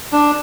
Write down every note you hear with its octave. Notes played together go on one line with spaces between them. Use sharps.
D4